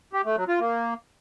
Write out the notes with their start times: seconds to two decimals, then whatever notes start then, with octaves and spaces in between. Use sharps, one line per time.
0.13 G4
0.25 A3
0.36 F#3
0.48 F4
0.60 A#3